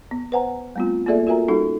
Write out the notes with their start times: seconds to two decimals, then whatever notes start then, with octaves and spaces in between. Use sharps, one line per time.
0.11 B3
0.32 B4 C5 F#5 G#5 A#5
0.76 G3 A3 B3 C4 F4
1.06 A#3 F4 G#4 A4 D5 E5
1.27 F4 F#4 A#4 E5 G#5 A#5
1.48 G3 C#4 D#4 F#4 A4